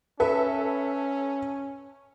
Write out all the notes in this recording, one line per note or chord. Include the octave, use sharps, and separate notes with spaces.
C#4 A4 B4 E5